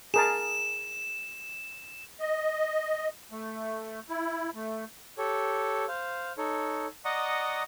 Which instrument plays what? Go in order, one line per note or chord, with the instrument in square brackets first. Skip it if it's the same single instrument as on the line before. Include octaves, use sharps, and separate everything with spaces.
[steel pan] G#4 A#4 A5 [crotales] E7
[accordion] D#5
A3
E4
A3
[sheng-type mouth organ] G4 A4 C#5
C5 F5
D#4 A4 C#5
D5 D#5 F#5 A#5 C#6 D#6